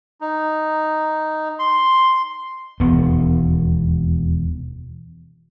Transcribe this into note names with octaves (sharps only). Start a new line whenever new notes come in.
D#4
C6
E1 D#2 B3